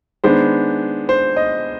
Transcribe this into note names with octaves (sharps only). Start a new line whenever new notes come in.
D#3 G#3 B3 D4 C5
C5
D#5